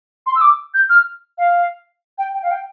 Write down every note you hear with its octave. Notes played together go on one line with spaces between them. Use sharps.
C6
E6
D6
G6
F6
F5
G5
G5
F5
G5